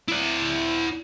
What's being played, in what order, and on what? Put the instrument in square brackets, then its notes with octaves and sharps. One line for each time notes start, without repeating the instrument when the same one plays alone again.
[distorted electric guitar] E4 D5